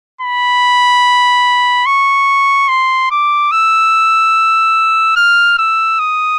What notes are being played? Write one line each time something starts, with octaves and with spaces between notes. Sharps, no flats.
B5
C#6
C6
D6
E6
F6
E6
D#6